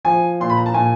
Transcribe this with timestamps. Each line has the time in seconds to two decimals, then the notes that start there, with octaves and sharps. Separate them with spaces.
0.05 F3 G#5
0.40 A#2 C6
0.50 B5
0.57 A#5
0.66 A5
0.74 A#2 G#5